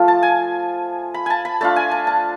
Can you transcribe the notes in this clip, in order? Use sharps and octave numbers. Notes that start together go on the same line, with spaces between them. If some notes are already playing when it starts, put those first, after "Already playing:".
Already playing: F3 A3 F4
A5
G#5
B5
G#5 A5
B5
A3 D4 F4 A5
G#5
A5
A5